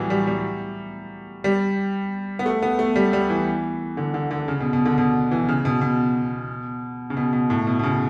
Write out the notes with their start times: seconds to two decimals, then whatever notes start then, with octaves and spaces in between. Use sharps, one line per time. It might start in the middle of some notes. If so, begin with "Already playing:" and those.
Already playing: A2 E3 F#3 G3
0.10 G3
0.27 G3
1.44 G3
2.39 B3
2.46 A3
2.62 B3
2.79 A3
2.96 G3
3.13 G3
3.30 E3
3.97 D3
4.14 D3
4.31 D3
4.48 C#3
4.60 B2
4.73 B2
4.85 D3
4.98 B2
5.31 E3
5.49 C#3
5.65 B2
5.81 B2
7.10 C#3
7.17 B2
7.33 B2
7.50 A2
7.67 B2
7.79 B2
7.83 C#3